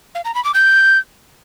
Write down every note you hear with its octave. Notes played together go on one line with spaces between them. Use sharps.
F5
A#5
B5
D6
G6